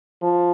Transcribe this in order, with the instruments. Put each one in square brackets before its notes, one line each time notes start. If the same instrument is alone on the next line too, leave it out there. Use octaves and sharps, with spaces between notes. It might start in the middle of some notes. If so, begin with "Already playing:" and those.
[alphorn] F3